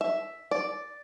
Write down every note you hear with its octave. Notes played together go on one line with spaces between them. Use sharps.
E5
D5